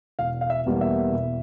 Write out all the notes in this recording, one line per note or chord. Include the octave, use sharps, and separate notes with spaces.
E1 F5
F5
E5
E2 B2 G3 A#3
E5
E1